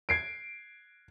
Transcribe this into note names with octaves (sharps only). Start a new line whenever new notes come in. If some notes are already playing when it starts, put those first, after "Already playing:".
G#6 C7 D7